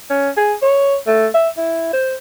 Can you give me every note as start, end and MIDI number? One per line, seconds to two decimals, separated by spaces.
0.10 0.29 61
0.37 0.54 68
0.62 0.97 73
1.07 1.27 57
1.34 1.49 76
1.57 1.89 64
1.93 2.15 72